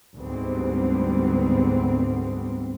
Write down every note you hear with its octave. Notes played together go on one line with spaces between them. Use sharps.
D2 G#2 G3 B3 C4